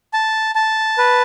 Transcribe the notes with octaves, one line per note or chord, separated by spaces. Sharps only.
A5
A5
B4